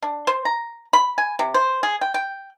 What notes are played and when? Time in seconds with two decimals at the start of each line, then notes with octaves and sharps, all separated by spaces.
0.02 D4
0.27 C5
0.45 A#5
0.93 B5
1.18 G#5
1.39 C3
1.54 C5
1.83 G#4
2.01 G5
2.14 G5